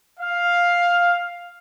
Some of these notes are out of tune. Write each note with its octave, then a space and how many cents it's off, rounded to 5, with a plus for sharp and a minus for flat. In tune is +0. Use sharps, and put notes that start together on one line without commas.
F5 +5